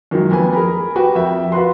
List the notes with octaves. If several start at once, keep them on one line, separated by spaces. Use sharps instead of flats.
F#2 D#3 F3 F#3 G#3
F2 A#3 B4 G#5
G#4 A#4 A#5 B5
F#4 G4 B4 G5
F2 A#4 E5 G5
F4 F#4 B4 C6